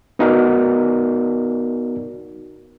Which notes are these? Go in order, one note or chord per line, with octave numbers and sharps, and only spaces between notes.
B3 D#4 F#4 A#4 D5